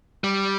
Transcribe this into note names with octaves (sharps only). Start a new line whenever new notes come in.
G3